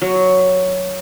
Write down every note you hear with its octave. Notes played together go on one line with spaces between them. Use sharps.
F#3